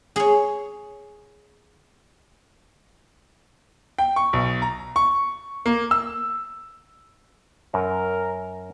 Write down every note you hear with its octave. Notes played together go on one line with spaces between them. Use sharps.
G#4 C#5
G5
C#6
B1
A#5
C#6
A#3
E6
F#2 A#4